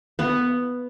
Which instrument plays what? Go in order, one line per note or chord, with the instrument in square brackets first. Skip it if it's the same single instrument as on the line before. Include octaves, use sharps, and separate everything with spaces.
[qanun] B3